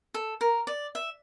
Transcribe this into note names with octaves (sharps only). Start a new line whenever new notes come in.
A4
A#4
D5
E5